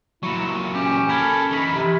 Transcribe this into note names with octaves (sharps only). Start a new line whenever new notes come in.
A#2 F#3 E4 C#6 C#7 E7
C#4 G4
A4 A#4 B5 F6 G#6
E3 D#4
C3